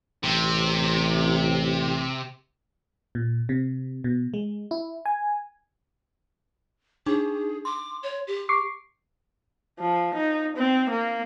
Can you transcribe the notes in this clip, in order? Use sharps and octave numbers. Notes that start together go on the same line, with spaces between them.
A1 C3
A#2
C3
B2
G#3
E4
G#5
D4 D#4 G#4
C6 D6
C#5
G4
C#6 D6 C7
F3
D#4
C4
A#3